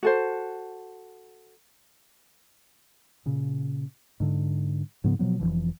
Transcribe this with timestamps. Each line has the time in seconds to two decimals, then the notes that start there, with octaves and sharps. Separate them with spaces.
0.03 F#4 A4 C5
3.26 A#2 C#3
4.20 G#2 D3
5.04 G#2 C#3 F3 B3
5.19 B2 F3 F#3 B3
5.40 F1 D#2 E3 F3